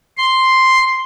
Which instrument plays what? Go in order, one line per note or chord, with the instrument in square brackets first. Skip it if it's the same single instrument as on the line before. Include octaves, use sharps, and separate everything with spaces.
[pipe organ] C6